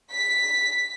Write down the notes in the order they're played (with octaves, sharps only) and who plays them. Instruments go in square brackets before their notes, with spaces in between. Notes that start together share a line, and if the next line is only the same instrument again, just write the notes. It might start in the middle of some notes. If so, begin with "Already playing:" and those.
[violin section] B6